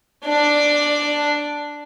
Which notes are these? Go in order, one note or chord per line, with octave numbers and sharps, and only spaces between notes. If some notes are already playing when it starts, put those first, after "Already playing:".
D4 D5